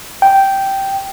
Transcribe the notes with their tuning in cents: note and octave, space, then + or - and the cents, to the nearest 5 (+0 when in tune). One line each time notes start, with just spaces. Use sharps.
G5 -10